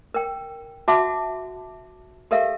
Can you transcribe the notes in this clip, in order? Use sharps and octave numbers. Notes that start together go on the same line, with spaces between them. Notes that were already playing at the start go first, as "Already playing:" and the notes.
A#4 G5
F#4 E5 F#5 A5 D6
G4 A4 A#4 E5 F5